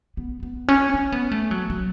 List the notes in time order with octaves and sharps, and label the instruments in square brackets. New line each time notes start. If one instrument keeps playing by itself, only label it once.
[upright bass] B3
B3
C#4
C#4
B3
A3
F#3
F#3